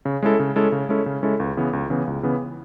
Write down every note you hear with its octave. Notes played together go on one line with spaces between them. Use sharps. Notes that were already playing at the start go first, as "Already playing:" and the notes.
C#3
G#3 C#4 E4 A4
C#3
G#3 C#4 E4 A4
C#3
G#3 C#4 E4 A4
C#3
G#3 C#4 E4 A4
C#2
C#3 E3 B3
C#2
C#3 E3 B3
C#2
C#3 E3 B3